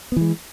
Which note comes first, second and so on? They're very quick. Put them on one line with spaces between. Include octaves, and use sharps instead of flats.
B3 E3 G#3